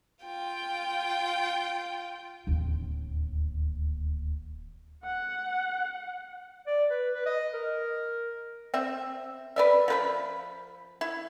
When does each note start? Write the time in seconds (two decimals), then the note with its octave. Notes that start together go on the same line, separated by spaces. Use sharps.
0.24 F4 G5
2.47 D1 D#2
5.04 F#5
6.67 D5
6.90 B4
7.15 B4
7.26 D#5
7.54 A#4
8.74 C4 E5
9.56 B4 D5 E5
9.88 F3 B4 B5
11.01 E4